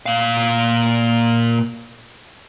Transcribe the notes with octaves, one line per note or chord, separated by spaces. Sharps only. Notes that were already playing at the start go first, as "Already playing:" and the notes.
A#2 F5